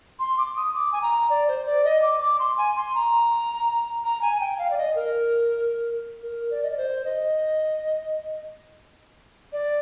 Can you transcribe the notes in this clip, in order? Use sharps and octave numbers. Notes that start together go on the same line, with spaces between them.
C6
D6
D#6
D6
G#5
A#5
D5
C5
D5
D#5
D6
D6
C6
G#5
C6
A#5
A#5
G#5
G5
F5
D5
D#5
A#4
A#4
D5
D#5
D5
C5
D#5
D5